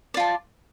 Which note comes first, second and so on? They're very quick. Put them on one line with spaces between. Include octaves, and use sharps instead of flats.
D5 F4 A5